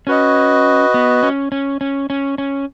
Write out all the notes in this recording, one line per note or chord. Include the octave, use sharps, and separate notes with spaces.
C#4 F#4 B4 D#5
B3
C#4
C#4
C#4
C#4
C#4